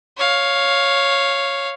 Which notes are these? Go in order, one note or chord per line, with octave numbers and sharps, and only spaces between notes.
C#5 F5